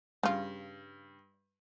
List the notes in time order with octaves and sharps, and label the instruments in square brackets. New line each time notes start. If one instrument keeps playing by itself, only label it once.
[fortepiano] G2 [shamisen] C#3 F4